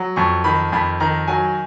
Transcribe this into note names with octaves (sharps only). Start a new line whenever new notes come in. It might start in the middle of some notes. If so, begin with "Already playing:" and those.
Already playing: F#3
F2 C#6
D#3 B5
F2 B5
D#3 A#5
F#3 G#5